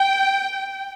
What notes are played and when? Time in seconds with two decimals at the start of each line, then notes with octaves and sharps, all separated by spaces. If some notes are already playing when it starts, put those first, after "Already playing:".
Already playing: G5